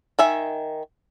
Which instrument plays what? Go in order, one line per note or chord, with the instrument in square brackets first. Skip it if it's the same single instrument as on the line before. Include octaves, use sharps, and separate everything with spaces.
[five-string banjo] D#3 E5 G#5